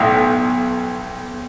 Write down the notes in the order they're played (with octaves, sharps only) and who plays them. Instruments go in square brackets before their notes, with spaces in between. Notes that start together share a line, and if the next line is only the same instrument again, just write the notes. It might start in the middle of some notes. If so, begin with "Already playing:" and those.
Already playing: [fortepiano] B1 A2